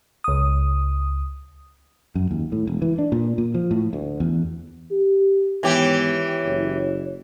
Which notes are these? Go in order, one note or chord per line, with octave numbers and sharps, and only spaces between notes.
C#2 D#6
F#2
D#2
A2
E1
E3
D4
A#2
A#2
F3
A2
D2
E2
G4
G#2 D#3 E3 B3 G4 C#5
F#1